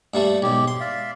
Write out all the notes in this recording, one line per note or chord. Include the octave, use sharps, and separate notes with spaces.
G2 G3 A3
B1 G#2 G4
C6
D5 E5 F5